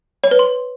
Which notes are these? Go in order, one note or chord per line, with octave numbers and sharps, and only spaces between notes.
C#5
B4
C6